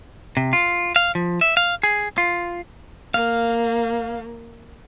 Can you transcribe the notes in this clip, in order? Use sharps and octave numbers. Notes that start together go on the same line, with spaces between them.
C3
F4
F5
F3
E5
F5
G#4
F4
A#3 F5